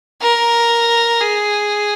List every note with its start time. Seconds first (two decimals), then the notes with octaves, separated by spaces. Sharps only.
0.22 A#4
1.21 G#4